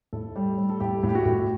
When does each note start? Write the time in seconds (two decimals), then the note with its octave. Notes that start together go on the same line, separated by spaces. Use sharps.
0.13 A2 A4
0.36 G3
0.58 G3
0.69 A4
0.80 A2 G4
1.03 A2
1.09 G4
1.15 F#4
1.26 A2